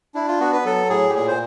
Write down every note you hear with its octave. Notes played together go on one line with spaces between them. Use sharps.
D4 E4
F4
B3 F#4
B4
F#3 A4
A2 G#4
G4
A#2 G#4
C5